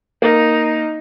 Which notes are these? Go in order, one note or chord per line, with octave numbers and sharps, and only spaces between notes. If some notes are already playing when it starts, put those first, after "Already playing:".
A#3 D#4